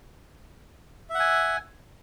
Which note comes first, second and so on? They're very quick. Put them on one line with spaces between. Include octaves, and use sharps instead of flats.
E5 F#5 G#5